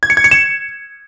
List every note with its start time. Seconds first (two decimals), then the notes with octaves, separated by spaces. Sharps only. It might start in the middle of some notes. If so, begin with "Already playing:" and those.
0.03 G#6
0.10 C#7
0.17 G#6
0.24 C#7
0.31 E7